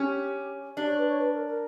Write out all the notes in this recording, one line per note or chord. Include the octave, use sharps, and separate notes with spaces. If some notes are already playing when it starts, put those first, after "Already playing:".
Already playing: C#4 G4
D4 G4
C#5
B4
C#5
B4
A#4
A#4